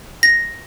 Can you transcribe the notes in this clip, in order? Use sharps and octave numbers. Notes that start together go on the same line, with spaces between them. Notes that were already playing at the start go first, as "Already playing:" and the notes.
A#6